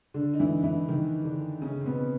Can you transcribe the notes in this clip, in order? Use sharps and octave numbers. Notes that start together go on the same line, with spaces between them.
D3 D4
D#4
E3 E4
E3 E4
D#3 D#4
D3 D4
C#3 C#4
C4
B2 B3